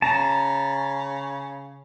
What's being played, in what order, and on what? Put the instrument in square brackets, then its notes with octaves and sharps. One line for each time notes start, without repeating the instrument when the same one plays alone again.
[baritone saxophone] C#3 [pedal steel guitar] A5 A#5